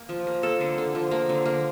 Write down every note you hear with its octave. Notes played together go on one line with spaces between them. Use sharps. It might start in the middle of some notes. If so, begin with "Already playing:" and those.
Already playing: A#3
F3
A#3
A#3 A4
D3
D3
F3
A#3
D3
A#3